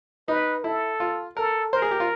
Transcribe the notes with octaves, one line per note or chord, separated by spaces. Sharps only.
D#4 B4
E4 A4
F4
A4 A#4
A#4 C5
G#4
G4
F4